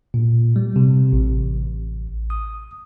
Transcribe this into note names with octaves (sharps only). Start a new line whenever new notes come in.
A#2
G3
C3
A1
D#6